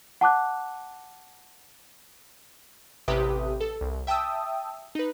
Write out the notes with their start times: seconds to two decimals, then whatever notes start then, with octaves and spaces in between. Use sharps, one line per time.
0.21 F#5 A5 D6 F#6
3.08 A1 C3 G4 B4 E5 D#6
3.61 A4
3.81 C2
4.07 E5 G5 A5 D#6 E6
4.95 D#4 B4